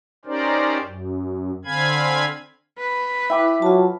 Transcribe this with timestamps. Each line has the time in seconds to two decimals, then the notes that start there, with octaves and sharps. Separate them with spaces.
0.25 C#4 D#4 G4 A#4 C5 D5
0.82 F#2
1.65 D3 C4 F5 G#5 B5 G#6
2.79 B4
3.30 E4 E5 G5 D6
3.62 F#3 F4 A5